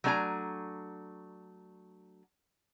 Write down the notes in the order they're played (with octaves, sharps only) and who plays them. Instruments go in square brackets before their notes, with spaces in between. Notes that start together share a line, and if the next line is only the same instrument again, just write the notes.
[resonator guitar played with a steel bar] F#3 A3 D4 A4 G#5 A#5